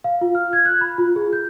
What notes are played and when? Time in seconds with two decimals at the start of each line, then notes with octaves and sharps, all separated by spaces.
0.04 F5
0.21 F4
0.35 F6
0.53 G#6
0.65 F#6
0.81 B5
0.98 F4
1.16 G#4
1.33 G6